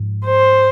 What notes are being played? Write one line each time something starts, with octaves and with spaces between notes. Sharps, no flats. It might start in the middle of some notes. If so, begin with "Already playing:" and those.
Already playing: G#2 F3
C5